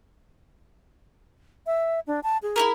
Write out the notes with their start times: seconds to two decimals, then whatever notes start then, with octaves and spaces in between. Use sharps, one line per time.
1.66 E5
2.07 D4
2.23 A5
2.43 G#4
2.56 E4 G4 A#4